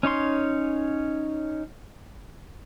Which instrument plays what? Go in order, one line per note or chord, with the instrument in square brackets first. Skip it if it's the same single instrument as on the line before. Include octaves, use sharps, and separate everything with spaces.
[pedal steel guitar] C#4 D#4 C#5 C6